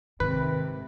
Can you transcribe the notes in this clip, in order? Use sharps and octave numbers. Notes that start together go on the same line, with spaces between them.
G#2 C3 D#3 B4